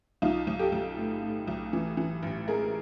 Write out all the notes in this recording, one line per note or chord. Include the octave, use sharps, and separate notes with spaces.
B1 D#4 F4
B1
G4 A4
B1
A2
A2
B1
E3
E3
A1
G#3 G#4 A#4